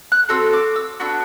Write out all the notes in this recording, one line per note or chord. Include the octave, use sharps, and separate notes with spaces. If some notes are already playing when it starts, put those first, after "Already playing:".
F#6
C4 F#4 A4 E6
D6
E6
B3 D4 F#4 E6